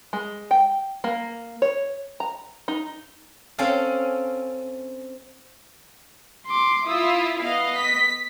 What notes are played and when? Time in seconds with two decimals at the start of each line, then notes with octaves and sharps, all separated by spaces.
0.13 G#3
0.51 G5
1.04 A#3
1.62 C#5
2.20 A#5
2.68 D#4
3.59 C4 C#4 A4 F5
6.47 C6 D6
6.87 E4 F4 D#6 E6
7.41 B3 D#5 F5
7.76 B6